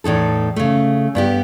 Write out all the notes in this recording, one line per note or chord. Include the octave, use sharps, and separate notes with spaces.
E2 A2 D#4 A4
C#3 A3
G2 B3 G4